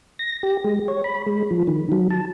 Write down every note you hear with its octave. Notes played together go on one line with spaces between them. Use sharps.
A#6
G4
G#3
C#5
B5
G#3
F3
D#3
F#3
A5